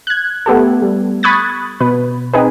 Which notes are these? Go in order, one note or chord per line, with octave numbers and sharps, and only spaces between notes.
F#6 G#6
A3 B3 G4 A4
G3
B5 C#6 D#6 F#6 G#6 A6
B2 B4
C4 D#4 G#4 B4